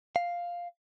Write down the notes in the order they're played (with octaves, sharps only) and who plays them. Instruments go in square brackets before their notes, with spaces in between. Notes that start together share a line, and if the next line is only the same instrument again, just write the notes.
[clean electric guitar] F5